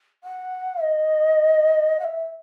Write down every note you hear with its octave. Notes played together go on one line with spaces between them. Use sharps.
F#5
D#5
F#5
E5